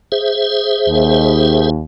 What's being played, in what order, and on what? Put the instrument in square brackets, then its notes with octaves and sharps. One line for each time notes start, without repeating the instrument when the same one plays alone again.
[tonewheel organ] G#4 C5 E5
[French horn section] D#2